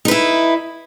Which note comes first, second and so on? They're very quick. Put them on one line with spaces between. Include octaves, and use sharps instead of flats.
D#4 B4 E4